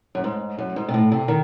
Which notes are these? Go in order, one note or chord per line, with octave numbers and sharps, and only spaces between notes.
F#2
G#2
F#2
G#2
C3
A2
C3
D#3